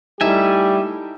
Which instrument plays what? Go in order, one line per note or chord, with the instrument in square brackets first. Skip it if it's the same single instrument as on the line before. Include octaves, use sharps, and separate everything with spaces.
[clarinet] G3 [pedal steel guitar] A3 E5 G#5 [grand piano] D#4 E4 A4 [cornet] G4